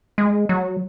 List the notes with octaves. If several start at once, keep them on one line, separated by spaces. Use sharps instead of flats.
G#3
F#3